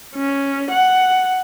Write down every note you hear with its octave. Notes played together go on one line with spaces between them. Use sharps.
C#4
F#5